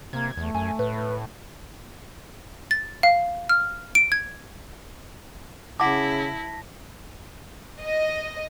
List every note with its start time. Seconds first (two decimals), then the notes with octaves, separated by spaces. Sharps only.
0.13 C3 A#3 G#6
0.37 E2 A3
0.55 F#2 G#5
0.79 A2 B4
2.71 A6
3.03 F5
3.49 F6
3.95 D7
4.12 G#6
5.80 C#3 E4 F#5 A5 D6 A#6 B6
7.80 D#5